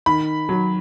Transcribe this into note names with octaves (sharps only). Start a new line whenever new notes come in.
D#3 B5
F#3